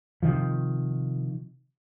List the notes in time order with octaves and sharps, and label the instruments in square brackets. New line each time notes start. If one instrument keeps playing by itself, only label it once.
[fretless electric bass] C3 D#3 F3